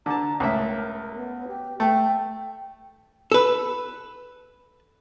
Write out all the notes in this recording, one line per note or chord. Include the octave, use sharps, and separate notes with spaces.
D3 A5 A#5
C#2 A2 A#4 E5
B3
G4
A3 G5
A4 B4